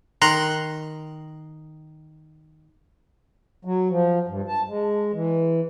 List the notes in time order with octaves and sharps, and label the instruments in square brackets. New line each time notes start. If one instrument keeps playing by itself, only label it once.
[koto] D#3 [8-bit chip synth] A#5 C6 F#6
[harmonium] F#3
F3
G2
A5
G#3
E3